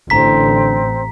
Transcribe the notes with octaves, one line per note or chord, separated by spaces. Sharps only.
A1 D3 C4 A#5 B6